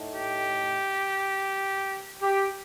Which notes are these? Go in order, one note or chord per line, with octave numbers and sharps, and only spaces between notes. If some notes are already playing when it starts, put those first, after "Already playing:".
Already playing: A2 A3 D#4
G4
G4